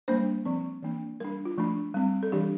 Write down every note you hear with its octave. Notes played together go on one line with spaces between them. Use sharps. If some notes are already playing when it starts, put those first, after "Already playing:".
G3 A#3 D4 C5
F3 C4
E3 A#3 D4
G3 D4 A#4
F4
F3 A3 D4
G3 C4
A4
E3 G3 D4 G4